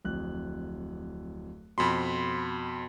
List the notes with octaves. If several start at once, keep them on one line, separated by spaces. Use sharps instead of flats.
D1 F2 F#6
F2 B2 B5 C6